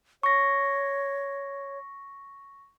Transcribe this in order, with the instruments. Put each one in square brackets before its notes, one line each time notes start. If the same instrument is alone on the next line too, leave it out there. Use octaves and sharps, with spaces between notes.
[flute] C#5 [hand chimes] C#6 A#6